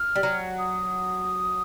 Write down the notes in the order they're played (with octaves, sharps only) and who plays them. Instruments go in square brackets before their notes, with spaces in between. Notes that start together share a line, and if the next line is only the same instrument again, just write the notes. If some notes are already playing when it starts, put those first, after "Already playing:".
Already playing: [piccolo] F6
[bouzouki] G3
F#3
[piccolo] D#6